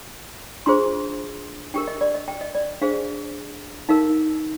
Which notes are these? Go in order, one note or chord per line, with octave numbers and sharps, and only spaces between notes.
D4 F4 G#4 C5 C6
D4 G4 A#4 G5
D#5
D5
D#5
G5
D#5
D5
D4 G#4 C5 F5
D#4 A#4 F5